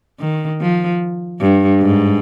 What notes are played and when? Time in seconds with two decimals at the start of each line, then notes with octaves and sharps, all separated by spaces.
0.20 D#3
0.61 F3
1.41 G2
1.82 G#2